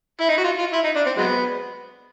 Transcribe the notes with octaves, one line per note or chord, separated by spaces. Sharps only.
E4
D#4
F#4
F4
F4
E4
D#4
D4
C4
F#3 G#3 B3